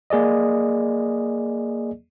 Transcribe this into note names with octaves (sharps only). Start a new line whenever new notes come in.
A#3 G#4 D5 D#5